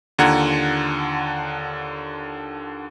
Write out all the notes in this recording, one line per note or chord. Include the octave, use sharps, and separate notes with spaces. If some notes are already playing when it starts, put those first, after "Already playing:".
D#2 D3 F4 F#5 A#5 G#6